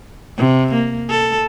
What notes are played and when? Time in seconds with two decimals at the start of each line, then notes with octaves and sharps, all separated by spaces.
0.38 C3
0.74 A#3
1.10 A4